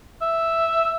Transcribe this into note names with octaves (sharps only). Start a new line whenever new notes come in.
E5